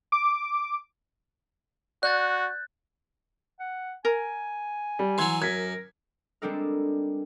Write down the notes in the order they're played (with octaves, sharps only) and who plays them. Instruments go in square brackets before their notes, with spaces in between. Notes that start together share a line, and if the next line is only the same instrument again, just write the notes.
[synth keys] D6
[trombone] F#4 [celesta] D5 [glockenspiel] F#6 G6 A6
[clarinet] F#5
[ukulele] A#4 [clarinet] G#5
[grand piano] G3
[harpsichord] E3 F#3 [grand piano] C6 G#6
[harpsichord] F#2 [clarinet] A#4 [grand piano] G#6 B6
[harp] G3 G#3 C4 D4 A4 A#4